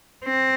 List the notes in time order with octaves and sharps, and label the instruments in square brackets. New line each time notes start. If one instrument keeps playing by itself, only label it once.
[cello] C4